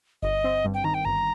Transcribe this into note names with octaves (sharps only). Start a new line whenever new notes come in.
G1 D#5
C4
G2
G5
D#3 A#5
G5
G1 A#5